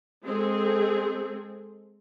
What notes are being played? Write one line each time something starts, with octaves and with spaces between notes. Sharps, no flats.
G#3 C4 G#4 A4